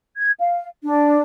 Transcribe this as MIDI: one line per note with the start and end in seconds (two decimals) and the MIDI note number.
0.17 0.31 92
0.40 0.66 77
0.83 1.22 62